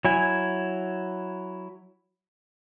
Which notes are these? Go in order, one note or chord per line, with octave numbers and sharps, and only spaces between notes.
F#3 E4 G#5